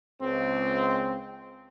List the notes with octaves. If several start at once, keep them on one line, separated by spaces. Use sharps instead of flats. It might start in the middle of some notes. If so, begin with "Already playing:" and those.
C#2 C4